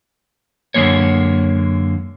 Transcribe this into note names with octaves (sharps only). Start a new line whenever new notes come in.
F#2 D3 G#3 A#3 C#5